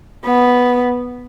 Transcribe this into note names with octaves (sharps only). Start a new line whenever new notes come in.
B3